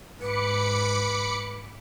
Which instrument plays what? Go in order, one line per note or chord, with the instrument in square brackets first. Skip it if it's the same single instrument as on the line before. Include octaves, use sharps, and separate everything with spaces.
[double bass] G#2 [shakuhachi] B4 [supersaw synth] B5 D6 C#7